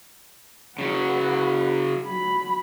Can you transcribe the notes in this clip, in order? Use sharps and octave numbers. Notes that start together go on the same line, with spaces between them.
C#3 F#3 B4 F#5
F#3 B5